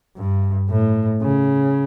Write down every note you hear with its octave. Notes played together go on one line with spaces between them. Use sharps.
G2
A2
C#3